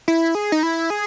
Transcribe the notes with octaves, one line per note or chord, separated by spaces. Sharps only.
E4
G#4
D#4
E4
G#4